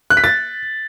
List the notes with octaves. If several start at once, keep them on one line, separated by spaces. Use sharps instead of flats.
F#6
B6
A6